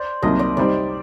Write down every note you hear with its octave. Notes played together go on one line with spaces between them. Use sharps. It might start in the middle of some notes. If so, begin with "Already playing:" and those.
Already playing: C5 D5
C2 C3 F#3 A#3 D#4 D#5
D5
C3 G3 C4 D#4 D5